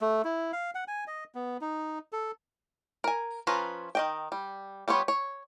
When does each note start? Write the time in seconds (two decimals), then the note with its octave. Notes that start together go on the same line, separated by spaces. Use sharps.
0.01 A3
0.24 E4
0.53 F5
0.75 F#5
0.88 G#5
1.07 D#5
1.35 B3
1.61 D#4
2.12 A4
3.04 A#4 G#5
3.47 F3 C#4 F4 B4 A#5
3.95 D#3 D#5 G5
4.32 G3
4.88 G3 B3 F4 C#5
5.08 C#5